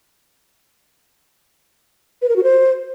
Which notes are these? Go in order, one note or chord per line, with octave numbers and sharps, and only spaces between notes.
B4
A#4
F#4
C5